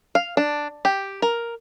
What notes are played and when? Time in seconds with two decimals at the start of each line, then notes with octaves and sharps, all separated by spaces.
0.15 F5
0.37 D4
0.85 G4
1.22 A#4